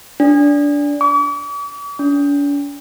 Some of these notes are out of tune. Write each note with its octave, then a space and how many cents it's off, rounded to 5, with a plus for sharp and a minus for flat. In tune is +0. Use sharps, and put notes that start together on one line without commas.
D4 -15
D6 -45
D4 -45